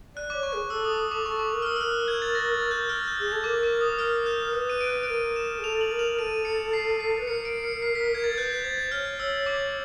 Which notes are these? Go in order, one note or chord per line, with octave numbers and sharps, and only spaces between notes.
D5 F#6
C#5 D6
C#6
G#4
A4 E6
D#6
D#6
D6
A4 C#6
D6
A#4
F6
E6
F6
A#4 F#6
G#6
A6
A#6
A6
G6
F6
G6
G#4
G#6
A4
A#4 D6
D6
D#6
A#4 F6
G6
B4
D#7
D7
D7
A#4 D#7
E7
G#4
A4 F7
F#7
A#4
F7
A4 D#7
C#7
C7
C7
B4
A#4 C#7
D7
C#7
C7
B6
G#6
A6
B4 G6
G#6
C5 A6
G#6
C#5 F6
C#5 E6
D6